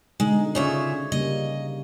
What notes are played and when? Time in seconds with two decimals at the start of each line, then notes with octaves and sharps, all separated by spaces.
0.20 B2 D3 G#3 D#4
0.55 C#3 F4 G#4 C#5 D5 E5
1.12 C#3 G3 A#3 D#5